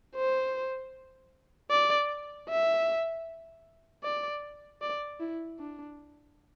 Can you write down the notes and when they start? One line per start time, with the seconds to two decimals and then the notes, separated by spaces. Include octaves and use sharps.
0.16 C5
1.70 D5
2.49 E5
4.04 D5
4.82 D5
5.20 E4
5.59 D4